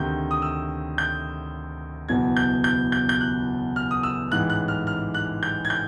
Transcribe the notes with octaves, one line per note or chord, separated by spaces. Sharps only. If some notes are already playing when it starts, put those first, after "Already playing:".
Already playing: D2 C3 D#3 G6
D#6
E6
G6
F#1 E2 B2 G#6
G6
G6
G6
G6
F#6
F6
D#6
E6
A1 G#2 E3 F#6
F#6
F6
F6
F#6
G6
G#6
G6